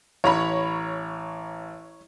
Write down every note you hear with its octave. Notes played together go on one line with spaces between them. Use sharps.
A1 C#5 A#5 B5